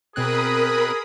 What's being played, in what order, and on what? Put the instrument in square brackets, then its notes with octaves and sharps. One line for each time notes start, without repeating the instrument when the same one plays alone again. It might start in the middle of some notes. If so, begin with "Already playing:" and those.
[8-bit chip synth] B2 C4 F#6 [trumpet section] G#4 [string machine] A#4 B5 D#6